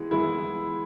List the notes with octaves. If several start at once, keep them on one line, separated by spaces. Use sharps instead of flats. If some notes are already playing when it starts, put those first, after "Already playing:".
Already playing: E3 G#3 B3
E3 G#3 B3 E4